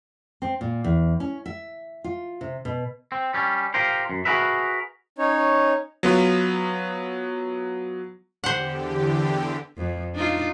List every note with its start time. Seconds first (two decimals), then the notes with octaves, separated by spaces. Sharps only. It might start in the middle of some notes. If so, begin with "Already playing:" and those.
0.42 C4
0.61 A#2
0.84 E2
1.20 C#4
1.46 E5
2.04 F4
2.41 C3
2.65 B2
3.12 C4
3.34 G3 C#4
3.74 F4 G4 A#4 C5
4.10 F#2
4.25 F#4 G#4 A#4 B4 E5
5.18 C#4 D#4 C#5
6.03 F#3 B3 F4
8.44 E2 D3 G4 C5 F#5
9.78 F2
10.15 D4 D#4 F4